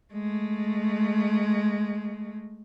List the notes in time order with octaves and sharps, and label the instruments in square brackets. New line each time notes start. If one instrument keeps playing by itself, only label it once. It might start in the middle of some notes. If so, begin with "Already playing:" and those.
[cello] G#3 A3